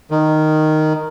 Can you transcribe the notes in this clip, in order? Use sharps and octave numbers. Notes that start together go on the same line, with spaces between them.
D#3